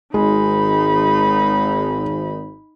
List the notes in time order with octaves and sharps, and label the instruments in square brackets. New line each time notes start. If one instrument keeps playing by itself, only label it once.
[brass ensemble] G#1 [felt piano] G#3 [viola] D#4 B5